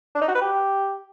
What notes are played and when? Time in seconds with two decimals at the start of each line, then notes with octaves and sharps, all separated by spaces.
0.15 D4
0.22 D#4
0.28 F#4
0.35 B4
0.42 G4